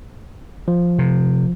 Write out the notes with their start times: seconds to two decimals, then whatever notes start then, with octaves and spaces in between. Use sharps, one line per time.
0.68 F3
0.99 C3